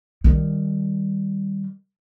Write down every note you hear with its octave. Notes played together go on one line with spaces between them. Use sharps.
D#3 G3